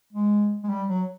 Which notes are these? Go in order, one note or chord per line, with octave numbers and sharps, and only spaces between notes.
G#3
G#3
G3
F#3